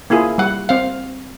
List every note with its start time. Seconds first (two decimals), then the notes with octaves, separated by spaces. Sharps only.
0.10 A#3 E4 F4 G#4
0.38 G3 F#5
0.69 C4 F5